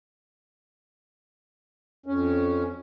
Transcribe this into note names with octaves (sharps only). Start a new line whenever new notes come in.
F2 C#4